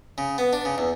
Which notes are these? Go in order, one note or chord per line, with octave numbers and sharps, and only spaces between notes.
C#3
B3
D4
C#3
E2